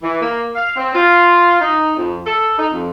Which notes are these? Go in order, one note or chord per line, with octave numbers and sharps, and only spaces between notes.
E3
A#3
F5
C4
F4
D#4
F2
A4
D#4
F2